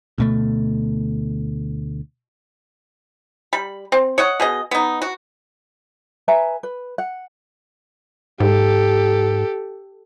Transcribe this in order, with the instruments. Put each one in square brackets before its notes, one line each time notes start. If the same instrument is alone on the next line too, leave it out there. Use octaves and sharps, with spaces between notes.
[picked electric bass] D2 B2 A3
[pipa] G3 B5
C4
C#5 D#5 F#5
B2 G#4 D#5
B3 D#4
F#4
[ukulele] B4 E5 G#5 A#5
B4
F#5
[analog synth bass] G#2 [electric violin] G4 A4